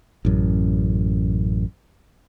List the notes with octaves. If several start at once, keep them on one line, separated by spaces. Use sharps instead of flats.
A1 F#2